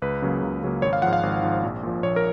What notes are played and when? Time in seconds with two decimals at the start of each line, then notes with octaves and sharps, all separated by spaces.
0.02 C#2 B4
0.22 C#3 F#3 A#3
0.43 C#2
0.63 C#3 F#3 A#3
0.82 G#1 C#5
0.93 F5
1.02 G#2 F3 F#5
1.13 F5
1.23 G#1
1.43 G#2 F3
1.63 A#1
1.83 A#2 F3
2.03 A#1 C#5
2.16 A#4